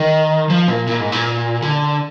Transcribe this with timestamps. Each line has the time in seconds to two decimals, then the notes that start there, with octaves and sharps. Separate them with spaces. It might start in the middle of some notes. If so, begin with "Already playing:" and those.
Already playing: D#3
0.50 F3
0.68 A#2
0.87 A#2
1.00 G#2
1.12 A#2
1.62 D3